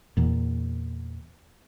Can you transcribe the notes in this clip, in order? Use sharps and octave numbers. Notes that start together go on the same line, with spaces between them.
E2 A#2